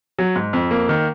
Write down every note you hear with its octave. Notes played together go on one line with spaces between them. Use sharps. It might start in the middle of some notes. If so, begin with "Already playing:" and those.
F#3
G#2
F2
A#3
D#3